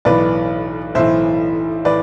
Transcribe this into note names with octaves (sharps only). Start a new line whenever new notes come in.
B1 A2 E3 B4 D5
B1 A2 E3 C5 E5
A2 E3 B4 D5